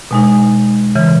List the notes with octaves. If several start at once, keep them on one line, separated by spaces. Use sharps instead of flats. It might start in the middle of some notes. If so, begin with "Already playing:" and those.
B2 G#3 D#4
C#3 E3